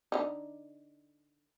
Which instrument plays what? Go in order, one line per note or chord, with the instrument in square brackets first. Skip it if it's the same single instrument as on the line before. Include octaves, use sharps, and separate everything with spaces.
[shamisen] D3 E3 D#4